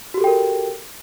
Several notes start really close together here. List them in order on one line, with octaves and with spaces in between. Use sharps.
F#4 G4 A4 G5 A#4